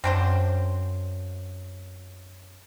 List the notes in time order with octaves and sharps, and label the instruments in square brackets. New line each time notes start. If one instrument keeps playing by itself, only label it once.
[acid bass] F#2 [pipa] C4 D4 C5